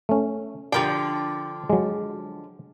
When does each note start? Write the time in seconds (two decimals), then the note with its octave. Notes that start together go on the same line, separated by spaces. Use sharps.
0.09 A3 C#4
0.72 D3 F3 G4 A#4 D5 G5
1.70 F#3 G#3